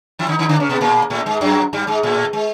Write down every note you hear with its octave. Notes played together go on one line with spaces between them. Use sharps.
E3 E4
D#3 D#4
D#3 D#4
D3 D4
C#3 C#4
B2 B3
A#2 A#3
A2 A3
G#2 G#3
F#2 F#3
G2 G3
G#2 G#3
A2 A3
G#3